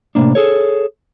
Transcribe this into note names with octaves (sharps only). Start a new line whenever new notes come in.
A2 C3 D#3 A#3 D4
G#4 A4 C#5